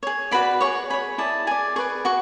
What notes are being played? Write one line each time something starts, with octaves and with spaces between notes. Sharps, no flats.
G#4 C#5
F#4 B4 D5 B5
G#4 C#5 C#6
G#4 C#5 B5
E4 G#4 D5 A5
G#4 D5 G#5
G#4 B4 D5 C#6
F#4 C#6